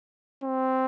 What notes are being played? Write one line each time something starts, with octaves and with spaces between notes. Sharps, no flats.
C4